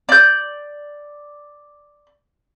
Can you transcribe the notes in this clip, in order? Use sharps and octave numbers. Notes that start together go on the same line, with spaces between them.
D5 G6